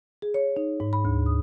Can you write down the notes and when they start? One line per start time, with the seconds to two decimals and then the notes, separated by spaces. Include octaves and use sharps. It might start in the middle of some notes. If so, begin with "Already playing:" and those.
0.22 G#4
0.34 C#5
0.57 D#4
0.80 G#2
0.93 B5
1.05 D2
1.26 D#6